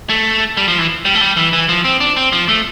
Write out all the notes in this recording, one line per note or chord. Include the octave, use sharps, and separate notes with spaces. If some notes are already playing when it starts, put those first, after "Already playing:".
A3
G3
F3
E3
G3
A3
G3
E3
E3
F3
C4
D4
C4
F3
A3